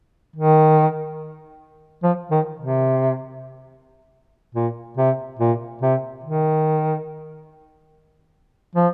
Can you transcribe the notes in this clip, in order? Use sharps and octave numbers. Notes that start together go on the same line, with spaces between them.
D#3
F3
D#3
C3
A#2
C3
A#2
C3
D#3
F3